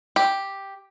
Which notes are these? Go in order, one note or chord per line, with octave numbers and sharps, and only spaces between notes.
G4